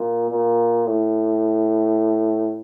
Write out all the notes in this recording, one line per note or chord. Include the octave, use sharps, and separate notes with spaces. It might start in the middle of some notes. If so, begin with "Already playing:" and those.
Already playing: A#2
A#2
A2